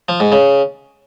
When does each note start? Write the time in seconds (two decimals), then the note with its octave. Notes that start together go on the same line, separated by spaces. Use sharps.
0.09 F3
0.20 G#2
0.32 C#3